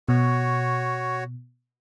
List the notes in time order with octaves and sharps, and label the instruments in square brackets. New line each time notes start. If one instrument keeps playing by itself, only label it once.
[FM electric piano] B2 [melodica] F#4 C#5